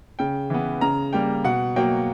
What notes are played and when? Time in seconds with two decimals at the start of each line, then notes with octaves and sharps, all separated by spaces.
0.19 C#3 G5
0.50 E3 B3
0.81 C#3 A#5
1.13 G3 A#3 G5
1.44 B2 F#5
1.76 F#3 A#3 G5